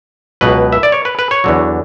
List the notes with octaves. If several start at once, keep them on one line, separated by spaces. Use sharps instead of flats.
C#2 B2 F#3 B4
E5
D5
C#5
B4
B4
C#5
E2 D3 F#3